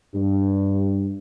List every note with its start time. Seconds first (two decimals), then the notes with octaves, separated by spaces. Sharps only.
0.14 G2